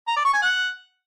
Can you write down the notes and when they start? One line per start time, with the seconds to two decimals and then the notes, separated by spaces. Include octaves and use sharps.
0.07 A#5
0.16 D5
0.25 C#6
0.33 G#5
0.42 F#5